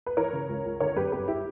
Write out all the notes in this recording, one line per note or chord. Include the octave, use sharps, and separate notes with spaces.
B4
E3 A#4 C#5
C#3
C#2
C#2
D3 A#4 C#5
F#2 G4 B4
G1 G4 B4
E4 G4